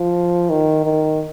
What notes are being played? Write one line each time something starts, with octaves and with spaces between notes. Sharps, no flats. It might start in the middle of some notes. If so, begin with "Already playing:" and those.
Already playing: F3
D#3
D#3